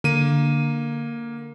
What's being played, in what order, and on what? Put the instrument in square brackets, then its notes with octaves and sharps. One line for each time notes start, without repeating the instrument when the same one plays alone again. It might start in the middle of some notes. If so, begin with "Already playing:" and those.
[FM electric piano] D3 [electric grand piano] A#3 D#7